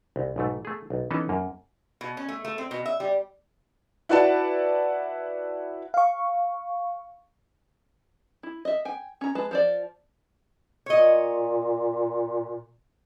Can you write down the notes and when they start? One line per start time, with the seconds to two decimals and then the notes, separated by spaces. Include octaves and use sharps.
0.16 C2
0.36 B1 G#2 A3
0.65 A3 G#4
0.90 B1
1.11 E3 B3 C#4 D#4 A4 D#5
1.29 F#2 A#3
2.01 B2
2.17 C#4
2.28 A3
2.44 A3
2.58 C4
2.71 B2
2.86 E5
3.00 G3
4.09 E4 F#4 B4 D5 F#5 A5
5.94 F5 C#6
8.43 E4
8.65 D#5 E5
8.85 G5 G#5
9.21 C#4 A#5
9.35 G#3 B4 A5
9.51 F3 C5 D5
10.86 A#2 C#5 D#5